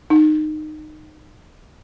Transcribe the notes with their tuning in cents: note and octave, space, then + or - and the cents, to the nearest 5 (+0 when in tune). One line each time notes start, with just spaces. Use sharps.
D#4 -20